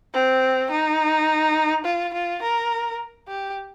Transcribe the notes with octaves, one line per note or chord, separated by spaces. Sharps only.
C4
D#4
F4
F4
A#4
G4